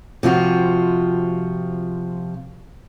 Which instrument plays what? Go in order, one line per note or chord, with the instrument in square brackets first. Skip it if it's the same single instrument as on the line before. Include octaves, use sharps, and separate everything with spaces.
[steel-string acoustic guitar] C3 F3 F4 F#4